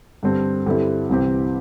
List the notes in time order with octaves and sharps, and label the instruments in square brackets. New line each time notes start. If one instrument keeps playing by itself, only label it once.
[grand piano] G2 D3 G3 C4 A4
G2 D3 G3 C4 E4
C2 C3 E3 C4 G4